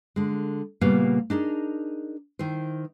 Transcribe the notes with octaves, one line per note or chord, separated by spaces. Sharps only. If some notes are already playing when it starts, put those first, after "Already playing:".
D3 G#3
A#2 C#3 G3 A#3 B3 F5
D4 D#4 G#4 A#4
D#3 E4 C5